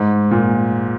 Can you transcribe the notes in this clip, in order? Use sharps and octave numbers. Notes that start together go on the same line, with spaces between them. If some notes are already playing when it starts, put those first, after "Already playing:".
Already playing: G#2
A#2